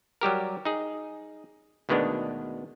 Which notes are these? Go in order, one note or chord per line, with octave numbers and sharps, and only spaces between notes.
F#3 G3 G4 A#4
D#4 G#4
D2 B2 D#3 G#3 B3 D4